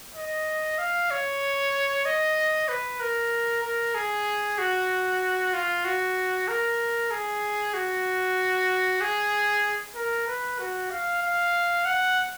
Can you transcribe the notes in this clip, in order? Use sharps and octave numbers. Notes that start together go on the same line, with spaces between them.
D#5
F5
C#5
D#5
B4
A#4
A#4
G#4
F#4
F4
F#4
A#4
G#4
F#4
G#4
A#4
B4
F#4
F5
F5
F#5